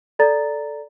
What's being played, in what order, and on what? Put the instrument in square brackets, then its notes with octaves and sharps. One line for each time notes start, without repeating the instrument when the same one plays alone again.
[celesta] A4 D5 A#5 A6